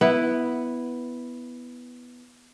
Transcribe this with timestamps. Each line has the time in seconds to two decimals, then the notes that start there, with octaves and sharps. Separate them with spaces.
0.01 B3 E4